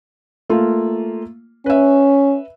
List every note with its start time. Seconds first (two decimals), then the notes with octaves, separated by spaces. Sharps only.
0.50 A3 A#3 F4
1.66 C#4 B4 E5